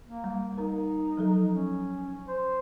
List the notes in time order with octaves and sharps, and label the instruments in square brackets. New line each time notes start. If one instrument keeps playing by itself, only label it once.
[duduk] A#3
[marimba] G3
[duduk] D#4 [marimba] A#4 A#5
[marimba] F3 F#3 A4
[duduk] C#4
C5